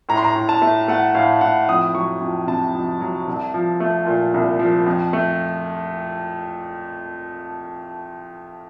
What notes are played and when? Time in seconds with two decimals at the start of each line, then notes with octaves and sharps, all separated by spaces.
0.09 A2 A#5
0.17 C6
0.24 A#5
0.35 A2
0.49 A5
0.62 A3
0.88 A3 F#5
1.15 A2 F5
1.41 A2 F#5
1.68 F2 D#6
1.95 F#3 C#6
2.21 F2
2.47 C3 A5
2.75 F2
3.01 F#3
3.28 C2
3.54 F3
3.80 A3
4.06 A#2
4.34 C2
4.59 F3
4.86 F2
5.13 A3